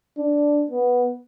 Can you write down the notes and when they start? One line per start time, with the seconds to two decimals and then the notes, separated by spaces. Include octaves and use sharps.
0.18 D4
0.71 B3